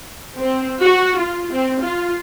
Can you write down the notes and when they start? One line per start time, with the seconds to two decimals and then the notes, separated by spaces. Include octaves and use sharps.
0.38 C4
0.81 F#4
1.20 F4
1.52 C4
1.82 F4